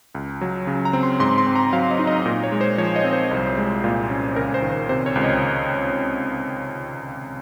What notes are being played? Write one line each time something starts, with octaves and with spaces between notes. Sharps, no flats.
C#2
F#3
C#3
A#5
C4
C6
G#2 C6
C6
C4
A#5
F#3 F5
D#5
D#4
D#5
A#2 A#4
C#5
G#3
C5
F3 C#5
D#5
C4
C5
C2
G#3
A#2
C#4
C#2 A#4
C5
D#3
C5
C3 C5
C#5
C#2
D#5